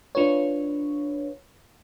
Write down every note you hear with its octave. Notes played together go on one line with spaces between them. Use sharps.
D4 F4 B4 C#5